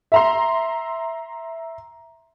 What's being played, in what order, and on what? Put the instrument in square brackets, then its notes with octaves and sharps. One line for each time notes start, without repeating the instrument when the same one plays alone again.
[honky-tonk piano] E5 A#5 C6